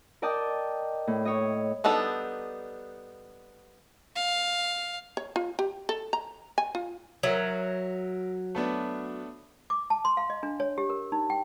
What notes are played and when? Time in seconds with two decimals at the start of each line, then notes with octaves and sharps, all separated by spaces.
0.22 A#4 D5 D#5 G5 A5
1.07 A2
1.25 C#5 D#5
1.84 G3 B3 D4 D#4 A4
4.15 F5
5.17 C#5
5.36 F4
5.59 G4
5.89 A4
6.13 A#5
6.58 G#5
6.75 F4
7.23 F#3 A#4 E5
8.55 A3 B3 D4
9.70 D6
9.90 A5
10.05 C6
10.17 F5
10.30 D#5
10.43 D4
10.60 C#5
10.78 G4
10.90 A#4
11.12 D#4
11.30 G5